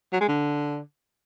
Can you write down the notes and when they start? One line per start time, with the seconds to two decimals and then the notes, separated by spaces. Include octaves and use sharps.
0.13 F#3
0.21 G#3
0.28 D3